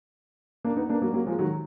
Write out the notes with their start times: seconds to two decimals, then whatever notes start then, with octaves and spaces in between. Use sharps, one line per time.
0.64 A#3 D4
0.77 B3 D#4
0.89 A#3 D4
1.02 F#3 A#3
1.14 F#3 A#3
1.27 F3 G#3
1.39 D#3 F#3